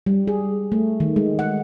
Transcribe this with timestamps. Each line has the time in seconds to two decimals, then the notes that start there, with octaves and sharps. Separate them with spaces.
0.06 G3
0.27 G#4
0.72 A3
1.00 D#3
1.16 G#3
1.39 F#5